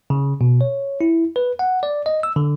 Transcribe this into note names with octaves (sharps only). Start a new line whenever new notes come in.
C#3
B2
C#5
E4
B4
F#5
D5
D#5
E6
D3